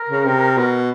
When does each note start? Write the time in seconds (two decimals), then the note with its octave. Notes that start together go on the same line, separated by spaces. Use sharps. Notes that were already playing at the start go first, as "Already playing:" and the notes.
Already playing: A#4
0.09 C#3
0.25 C3
0.57 B2